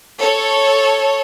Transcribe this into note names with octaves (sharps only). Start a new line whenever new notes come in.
A4 C#5